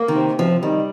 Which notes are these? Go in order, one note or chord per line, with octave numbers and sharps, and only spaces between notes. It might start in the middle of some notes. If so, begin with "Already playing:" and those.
Already playing: A#3
D#3
C3
C3 F3
D#3 G3